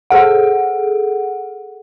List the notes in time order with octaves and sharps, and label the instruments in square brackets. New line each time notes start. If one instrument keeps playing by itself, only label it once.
[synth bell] G#4 A4 F#5